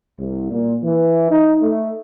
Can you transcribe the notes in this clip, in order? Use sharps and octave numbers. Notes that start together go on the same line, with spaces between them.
C2
A#2
E3
D#4
A3